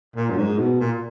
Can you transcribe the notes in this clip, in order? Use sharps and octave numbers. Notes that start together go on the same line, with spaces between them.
A#2
F#2
G#2
B2
A#2